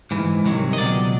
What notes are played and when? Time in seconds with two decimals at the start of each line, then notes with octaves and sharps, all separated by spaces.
0.11 G#2 E3
0.45 C2 C3 D#3 F#3
0.73 D#5
0.77 C#2 B2 F#3 D5